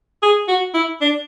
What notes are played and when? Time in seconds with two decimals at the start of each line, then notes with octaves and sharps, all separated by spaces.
0.23 G#4
0.48 F#4
0.74 E4
1.01 D4